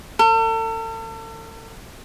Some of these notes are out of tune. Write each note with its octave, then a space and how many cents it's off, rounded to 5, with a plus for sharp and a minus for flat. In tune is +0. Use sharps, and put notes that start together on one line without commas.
A4 +40